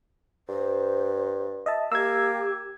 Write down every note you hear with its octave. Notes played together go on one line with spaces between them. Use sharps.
G2 C5
D#5 E5 A5
A#3 G4 E6 G#6